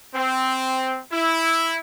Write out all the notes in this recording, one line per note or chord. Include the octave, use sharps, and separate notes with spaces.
C4
E4